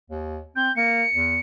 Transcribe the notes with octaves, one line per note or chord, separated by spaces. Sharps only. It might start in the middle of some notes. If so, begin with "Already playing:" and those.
D#2
C4 G6
A#3 C#7
E2